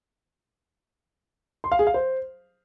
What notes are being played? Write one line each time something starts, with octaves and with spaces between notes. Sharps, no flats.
C6
F5
G#4
F5
C5